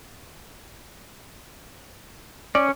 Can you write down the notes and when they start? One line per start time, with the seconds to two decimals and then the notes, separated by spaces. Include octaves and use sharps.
2.55 C#4 D5